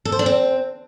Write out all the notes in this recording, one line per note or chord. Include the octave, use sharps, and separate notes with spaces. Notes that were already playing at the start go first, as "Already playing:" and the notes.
A4
C5
D4
C4